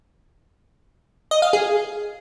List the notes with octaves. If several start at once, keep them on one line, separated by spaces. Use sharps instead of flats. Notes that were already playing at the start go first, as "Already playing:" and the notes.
D#5
F5
G#4